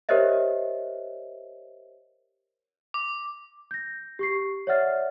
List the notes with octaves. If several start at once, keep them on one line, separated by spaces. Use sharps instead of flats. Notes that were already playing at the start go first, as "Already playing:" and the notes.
G4 A#4 C5 C#5 D#5 E5
D6
G6 A#6
G4 C#6 C7
C#5 D5 E5 F#5 F6 A6